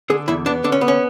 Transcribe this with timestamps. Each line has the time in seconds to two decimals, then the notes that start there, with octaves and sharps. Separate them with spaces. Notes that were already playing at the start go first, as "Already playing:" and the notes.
0.10 D3 G#4
0.28 E2 E4
0.46 B3 D4
0.64 D3 D4
0.72 C#4
0.81 B3
0.88 C#4